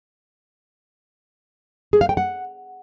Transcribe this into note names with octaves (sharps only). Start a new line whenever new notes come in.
G#4
F5
G5
F#5